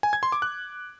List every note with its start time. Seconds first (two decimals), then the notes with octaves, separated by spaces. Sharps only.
0.03 G#5
0.13 G#6
0.23 C6
0.32 D6
0.42 F#6